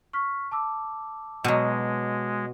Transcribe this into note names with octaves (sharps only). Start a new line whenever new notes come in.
C#6 F6 B6
A5 D6 E6
B2 F#3 G#3